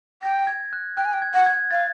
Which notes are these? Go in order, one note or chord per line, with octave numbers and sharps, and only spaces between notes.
G5 A#6
G#6
F#6
G5 F#6
G#5
G5
G#6
F#5
G#6
F5 A6